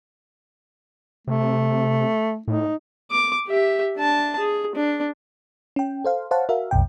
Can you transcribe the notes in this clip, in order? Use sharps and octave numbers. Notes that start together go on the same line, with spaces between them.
C3 A3
A2 D#4
D6
G4 E5
D4 A5
G#4
D4
C#4 G5
A4 C5 F5
C5 C#5 F5 F#5 A5
F#4 A#4 E5 F5
B1 F2 B2 G5